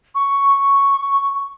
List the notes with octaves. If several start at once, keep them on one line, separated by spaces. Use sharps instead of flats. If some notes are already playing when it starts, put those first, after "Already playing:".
C#6